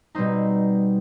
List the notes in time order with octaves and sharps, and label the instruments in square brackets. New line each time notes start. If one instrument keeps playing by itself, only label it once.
[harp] B2 G3 C4 D#4